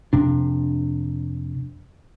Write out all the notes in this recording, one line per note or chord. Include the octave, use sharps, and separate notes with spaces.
F2 C3 D4